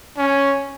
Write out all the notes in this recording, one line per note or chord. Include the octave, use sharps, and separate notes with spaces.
C#4